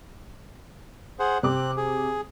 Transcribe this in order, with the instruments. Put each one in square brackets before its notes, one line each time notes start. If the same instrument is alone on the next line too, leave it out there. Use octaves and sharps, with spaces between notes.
[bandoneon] G#4 C5 F#5
[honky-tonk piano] C3 D6 [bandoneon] C4 F#6
[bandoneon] G#4